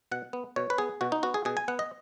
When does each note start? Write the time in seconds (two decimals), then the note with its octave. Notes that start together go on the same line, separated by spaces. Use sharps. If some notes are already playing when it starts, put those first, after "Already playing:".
0.12 B2 F#5
0.33 B3
0.56 B2 C#5
0.70 B4
0.78 B3 G#4
1.01 B2 F#4
1.12 D#4
1.23 B3 F#4
1.34 G#4
1.45 B2 G#4
1.57 G#5
1.68 B3 F#5
1.79 D#5